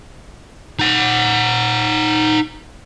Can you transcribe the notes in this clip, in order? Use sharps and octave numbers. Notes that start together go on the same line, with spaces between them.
D#4 F#5